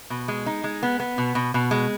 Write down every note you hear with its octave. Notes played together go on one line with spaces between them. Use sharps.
B2
G#3
D#4
G#3
B3
B3
B2
B2
B2
G#3